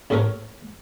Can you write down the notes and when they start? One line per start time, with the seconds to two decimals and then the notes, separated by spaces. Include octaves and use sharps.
0.10 A1 A2 C#3 A4 A#4 C#5